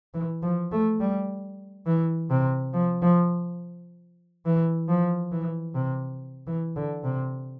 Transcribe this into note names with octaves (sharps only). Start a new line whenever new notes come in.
E3
F3
A3
G3
E3
C3
F3
F3
E3
F3
E3
C3
E3
D3
C3